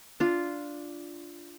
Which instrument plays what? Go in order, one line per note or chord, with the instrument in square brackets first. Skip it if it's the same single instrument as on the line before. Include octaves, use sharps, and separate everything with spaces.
[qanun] D4 F4